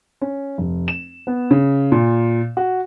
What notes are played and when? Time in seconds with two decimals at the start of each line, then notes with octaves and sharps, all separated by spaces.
0.22 C#4
0.58 F1
0.88 E7
1.27 B3
1.51 C#3
1.92 A#2
2.57 F#4